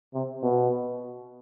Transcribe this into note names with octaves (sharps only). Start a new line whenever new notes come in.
C3
B2